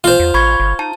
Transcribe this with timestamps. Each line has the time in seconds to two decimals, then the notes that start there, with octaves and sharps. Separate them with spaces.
0.04 E3 F4 C5
0.20 E2
0.34 A1 B5 C#6 G#6
0.60 G1
0.79 D#4 A5